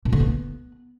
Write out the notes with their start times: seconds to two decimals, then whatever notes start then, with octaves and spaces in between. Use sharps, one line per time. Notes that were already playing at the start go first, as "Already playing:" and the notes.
0.05 A#2
0.13 D3
0.20 B3